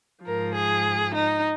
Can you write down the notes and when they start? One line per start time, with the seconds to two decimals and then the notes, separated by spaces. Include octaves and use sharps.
0.25 G#2 F3 A#4
0.55 G#4
1.15 D#4